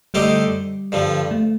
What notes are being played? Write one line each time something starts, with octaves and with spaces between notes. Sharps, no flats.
D3 G3 A3 D#4 G4 C5
G2 D3 F3
A3